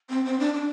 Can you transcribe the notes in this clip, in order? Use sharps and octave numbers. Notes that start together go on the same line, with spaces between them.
C4
C4
D4
D4